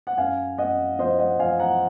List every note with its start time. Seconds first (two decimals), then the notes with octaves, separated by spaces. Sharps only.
0.07 F#5
0.17 F#2 F5 G#5
0.58 F#2 D#5 F#5
0.98 F3 C5 D#5
1.19 D#5 F#5
1.39 F3 F5 G#5
1.59 F#5 A#5